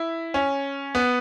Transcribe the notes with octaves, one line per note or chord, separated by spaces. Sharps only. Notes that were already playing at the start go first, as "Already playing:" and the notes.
Already playing: E4
C#4
B3